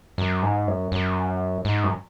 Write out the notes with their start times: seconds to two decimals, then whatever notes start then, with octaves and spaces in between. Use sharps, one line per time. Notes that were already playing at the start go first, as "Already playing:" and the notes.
0.18 F#2
0.42 G#2
0.67 F#2
0.92 F#2
1.65 G#2
1.84 F#2